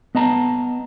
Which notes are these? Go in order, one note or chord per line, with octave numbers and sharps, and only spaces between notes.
B3 D#5 A5 A#5